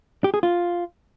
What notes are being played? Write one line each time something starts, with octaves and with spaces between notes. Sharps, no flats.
G4
G#4
F4